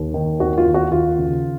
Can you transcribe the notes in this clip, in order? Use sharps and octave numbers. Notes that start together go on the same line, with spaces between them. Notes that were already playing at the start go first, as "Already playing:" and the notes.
Already playing: D#2
D#3
D#2 F#4
F4
D#3
F#4
D#2 F4
C#3